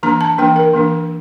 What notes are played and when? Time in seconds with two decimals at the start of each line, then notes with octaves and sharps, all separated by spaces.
0.03 E3 A#3 D4 A#5
0.21 A5
0.38 E3 A#3 D4 G5
0.56 A#4
0.73 E3 A#3 D4